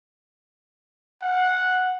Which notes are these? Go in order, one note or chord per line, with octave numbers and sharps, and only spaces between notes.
F#5